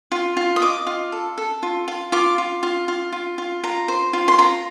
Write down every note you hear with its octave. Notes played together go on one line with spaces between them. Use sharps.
F4
F4
D#6
D#5 D6
F4
A4
A4
F4
F4
F4 D6
F4
F4
F4
F4
F4
F4 A#5
C5
F4
C6
F4 A#5